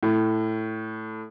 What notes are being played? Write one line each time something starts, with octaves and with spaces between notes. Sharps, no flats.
A2